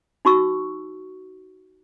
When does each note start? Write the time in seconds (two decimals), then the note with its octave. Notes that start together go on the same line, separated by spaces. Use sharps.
0.25 D#4 F#4 C#6 E6